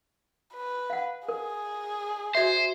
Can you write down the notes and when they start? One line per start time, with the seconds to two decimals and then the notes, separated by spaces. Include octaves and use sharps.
0.54 B4
0.90 F5 F#5
1.28 G#4 A#4
2.35 F#4 C5 D5 E5